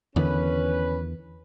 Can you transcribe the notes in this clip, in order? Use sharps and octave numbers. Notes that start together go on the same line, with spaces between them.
E2 D3 D#3 C#4 B4